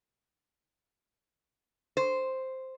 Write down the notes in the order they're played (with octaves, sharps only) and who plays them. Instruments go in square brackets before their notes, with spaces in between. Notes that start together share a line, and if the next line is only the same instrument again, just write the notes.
[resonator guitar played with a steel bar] C5